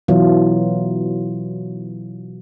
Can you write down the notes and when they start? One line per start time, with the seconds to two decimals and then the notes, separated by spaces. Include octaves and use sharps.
0.08 B2 E3 F#3 E4 F4